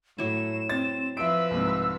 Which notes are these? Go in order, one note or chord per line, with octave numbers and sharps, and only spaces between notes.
A2 F#3 E4 E7
C4 A6
F3 B4 E5 E6 D7
C2 G#2